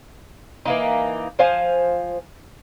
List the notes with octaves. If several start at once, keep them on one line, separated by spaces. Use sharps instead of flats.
E3 A#3 D#4
F3 C5 F5 G#5